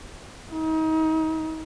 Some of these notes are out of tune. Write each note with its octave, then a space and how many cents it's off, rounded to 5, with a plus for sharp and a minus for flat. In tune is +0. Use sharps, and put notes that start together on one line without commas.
D#4 +30